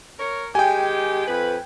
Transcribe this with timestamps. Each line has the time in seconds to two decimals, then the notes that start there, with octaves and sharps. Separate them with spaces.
0.19 A#4 C#5
0.55 D#3 G#3 G4 G5 G#5
1.28 F2 B4